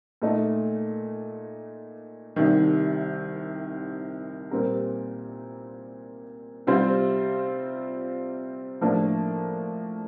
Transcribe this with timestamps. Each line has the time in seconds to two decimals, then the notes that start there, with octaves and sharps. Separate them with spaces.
0.22 A#2 A3 D#4
2.36 C2 C3 D#3
4.51 A#2 G3 C4 G4 A#4
6.67 C3 G3 C4 F4 C5
8.81 A2 F3 A#3 D4